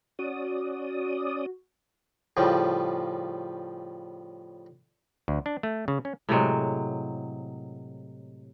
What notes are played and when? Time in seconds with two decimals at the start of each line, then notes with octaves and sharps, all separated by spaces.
0.19 C#4 F#4 D5 D#6
2.37 A2 C#3 F3 G3
5.28 D2
5.46 D4
5.63 A3
5.88 C#3
6.05 C#4
6.29 A2 C3 F#3 G#3